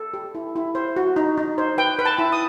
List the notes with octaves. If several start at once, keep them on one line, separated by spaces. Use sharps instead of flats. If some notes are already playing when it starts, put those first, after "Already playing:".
Already playing: A4
G4
E4
E4
C5
F#4
D#4
D#4
C5
B4 G5
B4
A5
E4
D#6